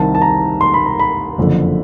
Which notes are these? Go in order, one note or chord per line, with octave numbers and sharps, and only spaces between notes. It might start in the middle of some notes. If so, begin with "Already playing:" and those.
Already playing: C2 C3 D#3 A5
A5
A#5
C6
B5
A#5
B5
F#1 F2 D3